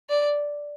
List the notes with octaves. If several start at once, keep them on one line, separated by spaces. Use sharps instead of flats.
D5